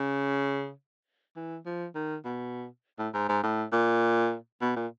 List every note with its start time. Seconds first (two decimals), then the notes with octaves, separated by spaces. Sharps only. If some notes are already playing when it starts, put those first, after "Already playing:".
Already playing: C#3
1.37 E3
1.66 F3
1.95 D#3
2.25 B2
2.99 A2
3.14 G#2
3.29 G#2
3.43 A2
3.73 A#2
4.62 B2
4.76 A#2